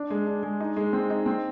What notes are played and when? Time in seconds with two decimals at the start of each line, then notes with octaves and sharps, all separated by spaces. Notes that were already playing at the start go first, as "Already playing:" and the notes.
Already playing: D4
0.10 G#3
0.27 D4
0.43 G#3
0.60 D#4
0.76 G#3
0.93 C4
1.10 D#4
1.26 C4